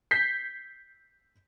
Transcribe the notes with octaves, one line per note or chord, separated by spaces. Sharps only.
G6 B6 C7